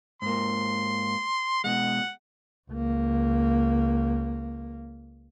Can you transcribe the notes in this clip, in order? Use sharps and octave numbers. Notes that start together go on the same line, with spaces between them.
G#2 A#3 C6
B2 G#3 F#5
C#2 A#3